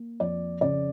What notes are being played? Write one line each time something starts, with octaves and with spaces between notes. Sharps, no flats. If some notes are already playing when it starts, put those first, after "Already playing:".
Already playing: A#3
F2 D5
C#3 D5